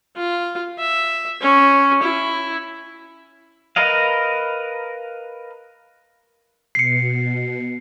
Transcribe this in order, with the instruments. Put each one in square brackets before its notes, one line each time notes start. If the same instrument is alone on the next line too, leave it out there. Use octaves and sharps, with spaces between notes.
[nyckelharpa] F4
E5
C#4
E4
[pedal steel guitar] A#4 B4 D#5 F5
[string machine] B2 [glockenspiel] C7 C#7